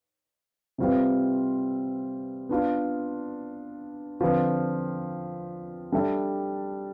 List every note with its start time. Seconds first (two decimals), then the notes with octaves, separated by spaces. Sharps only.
0.78 C3 G3 C4 F4 B4
2.49 B3 D4 F4
4.21 D3 F3 C4 F4 B4
5.92 G3 D4 A4 E5